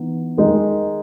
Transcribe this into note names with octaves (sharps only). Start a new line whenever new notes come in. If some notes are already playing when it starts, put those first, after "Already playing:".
Already playing: E3 B3 D#4
D#3 G#3 D#4